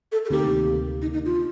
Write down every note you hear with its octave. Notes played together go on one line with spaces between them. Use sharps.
A4
A4
D2 C3 D#3 A#3 G4
D#4
D#4
F4